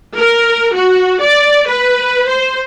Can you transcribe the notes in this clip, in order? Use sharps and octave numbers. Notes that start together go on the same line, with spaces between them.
A#4
F#4
D5
B4
C5